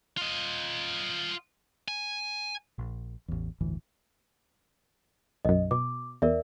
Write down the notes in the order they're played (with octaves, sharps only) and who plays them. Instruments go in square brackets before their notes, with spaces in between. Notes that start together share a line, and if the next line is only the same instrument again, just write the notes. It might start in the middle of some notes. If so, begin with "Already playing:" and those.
[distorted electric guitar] F4 D#5
G#5
[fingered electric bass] A#1
A1 E2
G1 D2 A2 E3
[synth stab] B1 F#2 [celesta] D#5
[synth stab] B2 [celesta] D6
[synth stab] E2 [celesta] A#4 D5 E5